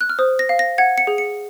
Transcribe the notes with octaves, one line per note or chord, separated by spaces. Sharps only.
F#6
F6
C5 D#6
A#6
F5
A#6
F#5 G#6
C#7
G#4
C#7